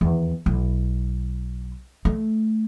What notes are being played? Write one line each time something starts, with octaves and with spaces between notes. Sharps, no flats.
E2 D#3
B1 E4
A3